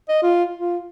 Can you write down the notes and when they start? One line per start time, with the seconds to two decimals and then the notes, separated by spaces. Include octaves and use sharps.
0.09 D#5
0.23 F4
0.57 F4